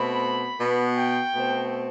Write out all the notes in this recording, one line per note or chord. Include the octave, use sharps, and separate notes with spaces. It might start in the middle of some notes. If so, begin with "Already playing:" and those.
Already playing: B2 A3 C4 B5
B2 B3
G5
B2 A3 C4